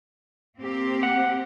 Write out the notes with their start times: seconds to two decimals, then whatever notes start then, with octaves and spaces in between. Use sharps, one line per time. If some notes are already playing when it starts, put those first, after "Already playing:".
0.58 A#3 C4 G4
1.03 F#5